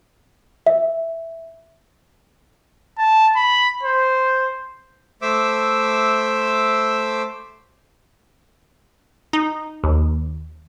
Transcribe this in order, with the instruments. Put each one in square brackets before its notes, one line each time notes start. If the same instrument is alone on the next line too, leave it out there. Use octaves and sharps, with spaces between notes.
[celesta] E5
[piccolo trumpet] A5
B5
C5
[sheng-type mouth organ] A3 C5 E5 D6 E6
[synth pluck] D#4
D#2